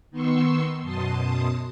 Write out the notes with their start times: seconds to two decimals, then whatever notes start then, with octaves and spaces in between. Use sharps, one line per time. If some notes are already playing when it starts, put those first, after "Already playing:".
0.11 D#3 B3 C6 C#6 E6
0.81 F#2 B2 A5 C6 D#6